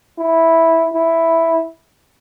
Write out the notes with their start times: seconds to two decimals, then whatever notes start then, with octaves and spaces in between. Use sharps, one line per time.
0.18 E4
0.93 E4